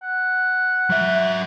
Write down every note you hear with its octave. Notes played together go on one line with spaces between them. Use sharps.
F#5
F#3 E5